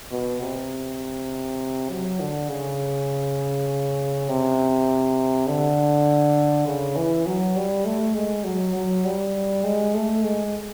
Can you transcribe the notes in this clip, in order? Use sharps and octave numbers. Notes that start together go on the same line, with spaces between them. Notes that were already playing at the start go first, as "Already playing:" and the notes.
B2
C3
F#3
D3
C#3
C3
D3
C#3
E3
F#3
G3
A3
G#3
F#3
F#3
G3
G#3
A3
G#3